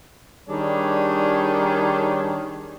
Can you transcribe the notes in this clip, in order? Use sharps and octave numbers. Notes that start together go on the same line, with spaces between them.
D#3 G3 D4 G#4 C#5